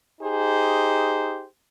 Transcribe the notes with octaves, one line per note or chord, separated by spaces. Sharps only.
D#4 G4 G#4 C5